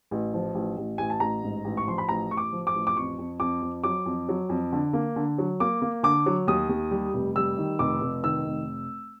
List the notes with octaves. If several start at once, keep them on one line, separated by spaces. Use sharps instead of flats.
A1
F3
A1
A1
A1 G#5
A5
A1 A#5
G#2
A1
C#6
F3 C6
B5
A1 A#5
A1 C#6
D6
F3
D6
A1
D6
F2 C#6
F2
F2 D6
F2
F#3 D6
F2
F#3
F2
D3
A#3
D3
F#3
A#3 D6
A#3
D3 D6
F#3
D#2 D#6
D#2
G3
F1
G3 E6
D#3
F1 D6
F1
D#3 E6
F1